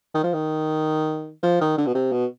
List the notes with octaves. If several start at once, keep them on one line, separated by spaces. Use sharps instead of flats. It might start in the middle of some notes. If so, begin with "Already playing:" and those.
D#3
F3
D#3
F3
D#3
D3
B2
C3
B2